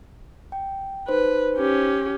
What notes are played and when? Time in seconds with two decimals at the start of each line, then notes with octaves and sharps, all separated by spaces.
0.52 G5
1.08 D#4 B4 C5
1.56 C#4 G4